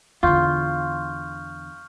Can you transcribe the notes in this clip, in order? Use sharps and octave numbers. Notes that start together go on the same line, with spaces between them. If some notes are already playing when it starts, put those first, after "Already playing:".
E2 D3 F4 C#6 F6 G6